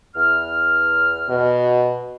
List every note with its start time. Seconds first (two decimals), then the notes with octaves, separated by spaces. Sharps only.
0.15 E2 F6
1.29 B2